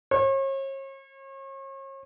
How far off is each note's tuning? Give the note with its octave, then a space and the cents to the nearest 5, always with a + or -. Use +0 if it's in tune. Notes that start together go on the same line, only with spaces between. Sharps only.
C#5 -40